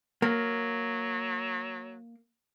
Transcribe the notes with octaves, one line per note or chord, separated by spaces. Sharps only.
F#3 A#3